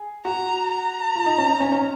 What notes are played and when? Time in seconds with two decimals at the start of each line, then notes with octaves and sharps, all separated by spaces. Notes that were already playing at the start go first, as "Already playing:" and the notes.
Already playing: G#4
0.25 F#4 A#5
0.71 A#5
1.15 F4
1.26 D#4
1.38 C#4
1.50 D#4
1.60 C#4
1.72 C#4